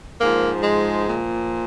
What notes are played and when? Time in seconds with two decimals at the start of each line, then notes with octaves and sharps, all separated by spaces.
0.20 G#2 F3 A#3
0.62 G#3
1.03 A#2 F3